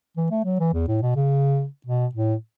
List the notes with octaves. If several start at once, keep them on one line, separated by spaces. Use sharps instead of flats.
E3
A3
F#3
E3
E2
A2
B2
C#3
B2
A2